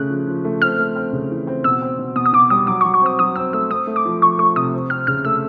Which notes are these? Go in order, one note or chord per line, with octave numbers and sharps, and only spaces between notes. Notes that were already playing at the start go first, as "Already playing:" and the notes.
Already playing: C#3 A3 C#4 F#6
F3
F3
A3
C4 F6
A3
C4
C#3
E3
C4
B2 E6
C4
B2
B2 D#6
D#6
B2 D6
G3 D#6
F#3 D6
F#3 C#6
C#6
C4 D#6
F#3 D#6
C4 E6
A3 E6
C4 D#6
A3
D6
F3
F3 C#6
A3 C#6
C3 D#6
C4
C4 F6
C#3 F6
A3 E6